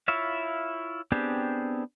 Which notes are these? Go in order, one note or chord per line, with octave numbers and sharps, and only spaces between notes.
E4 F4 C#5 E5 F5
B3 C4 D4 G4 G#4